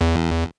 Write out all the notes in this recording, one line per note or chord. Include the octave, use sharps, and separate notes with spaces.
E2